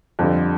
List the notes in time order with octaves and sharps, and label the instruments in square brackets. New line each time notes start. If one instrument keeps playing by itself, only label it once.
[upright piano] F2 D3 G3